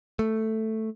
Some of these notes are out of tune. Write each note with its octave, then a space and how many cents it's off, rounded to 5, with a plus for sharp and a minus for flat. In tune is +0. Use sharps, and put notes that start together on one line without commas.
A3 +5